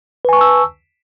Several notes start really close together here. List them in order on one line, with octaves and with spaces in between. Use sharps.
B4 G#5 C#6 A5 E6